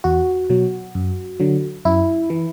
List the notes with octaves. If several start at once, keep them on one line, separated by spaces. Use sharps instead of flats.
E2 F#4
B2 F#3
F#2
D3 F#3
F#2 E4
E3